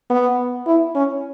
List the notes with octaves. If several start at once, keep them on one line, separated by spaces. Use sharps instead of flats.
B3
E4
C#4